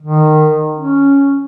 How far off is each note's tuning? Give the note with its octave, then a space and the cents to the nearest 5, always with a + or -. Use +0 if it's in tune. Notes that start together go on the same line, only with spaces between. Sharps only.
D#3 -20
C#4 +0